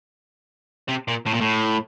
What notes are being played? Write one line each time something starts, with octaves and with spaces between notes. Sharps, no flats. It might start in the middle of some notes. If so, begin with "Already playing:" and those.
C3
A#2
A2
A#2
A2